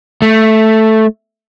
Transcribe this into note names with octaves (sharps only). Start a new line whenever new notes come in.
A3